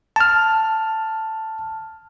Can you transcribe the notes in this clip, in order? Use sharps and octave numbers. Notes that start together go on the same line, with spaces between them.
A5 F6